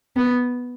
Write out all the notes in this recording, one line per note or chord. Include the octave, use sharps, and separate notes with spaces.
B3